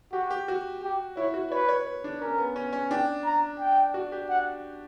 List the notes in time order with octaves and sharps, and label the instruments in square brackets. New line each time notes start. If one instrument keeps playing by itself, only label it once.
[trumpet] F#4 [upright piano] G4
[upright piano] G4
F#4
[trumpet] G4
[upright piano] E4 [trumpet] C#5
[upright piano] F#4
[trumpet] B4 [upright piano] C#5
[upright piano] C#5
B4
D4
[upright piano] C#4 [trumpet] A#4
[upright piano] B3
C#4
C#4
[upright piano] D4 [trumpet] G5
[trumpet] A#5
G5
[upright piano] F#4
G4
[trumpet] F#5